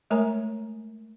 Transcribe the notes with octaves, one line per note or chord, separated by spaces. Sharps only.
G#3 A3 A#4 C#5 G#5 A#5